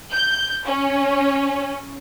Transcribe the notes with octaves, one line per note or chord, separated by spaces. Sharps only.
G6
C#4